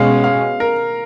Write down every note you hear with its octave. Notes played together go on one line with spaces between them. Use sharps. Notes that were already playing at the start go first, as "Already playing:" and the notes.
Already playing: B2 G#3 C#4 F5
F5
A#4